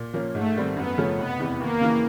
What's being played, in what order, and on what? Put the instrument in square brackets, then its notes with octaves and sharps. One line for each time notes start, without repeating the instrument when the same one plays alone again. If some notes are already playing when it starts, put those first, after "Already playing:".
Already playing: [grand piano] A#2
F3 A#3 C#4
[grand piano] G#2 [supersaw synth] A3
[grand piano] D#3 G3 C4
[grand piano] F#2 [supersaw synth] B3
[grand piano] C#3 F3 A3 C#4
[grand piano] F1 [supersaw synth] B3
[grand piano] E2 C3 E3
[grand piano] D#2 [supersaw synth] A#3
[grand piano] C#3 E3